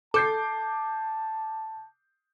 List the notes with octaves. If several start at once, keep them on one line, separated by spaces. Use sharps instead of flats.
A4 A5 D6 G6 C7